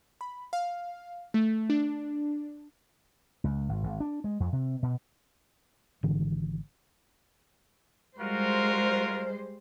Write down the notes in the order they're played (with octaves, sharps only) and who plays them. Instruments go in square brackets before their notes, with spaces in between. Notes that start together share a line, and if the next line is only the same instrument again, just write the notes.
[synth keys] B5
F5
A3
D4
[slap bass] C#2
G#1
G#1
D4
G#3
F2
C3
B2
[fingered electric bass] G#1 G#2 D3 E3
[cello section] G3 G#3 C5 [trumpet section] F4 F#4 A#4